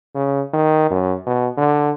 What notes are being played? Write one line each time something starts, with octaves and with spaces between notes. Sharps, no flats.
C#3
D#3
F#2
B2
D3